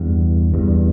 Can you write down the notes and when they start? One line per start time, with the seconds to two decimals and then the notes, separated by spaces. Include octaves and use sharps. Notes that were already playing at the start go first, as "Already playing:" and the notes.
Already playing: E2 G2
0.54 E2 G2